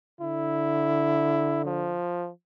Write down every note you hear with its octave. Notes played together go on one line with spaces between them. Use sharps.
D3 E4
F3